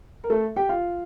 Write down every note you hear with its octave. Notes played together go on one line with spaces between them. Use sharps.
A#4
A3 A4
G4 G5
F4 F5